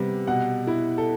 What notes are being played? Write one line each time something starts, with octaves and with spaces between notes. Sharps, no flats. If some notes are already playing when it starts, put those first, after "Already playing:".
Already playing: C3 G3 B3
B2 F#5
E4
A4